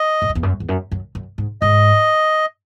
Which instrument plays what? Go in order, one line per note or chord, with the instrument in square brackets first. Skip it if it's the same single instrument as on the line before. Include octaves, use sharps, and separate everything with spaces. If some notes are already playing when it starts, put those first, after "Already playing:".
Already playing: [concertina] D#5
[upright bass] G#2
F#2
E2
F#2
E2
F#2
F#2
F#2
G#2
[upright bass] G#2 [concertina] D#5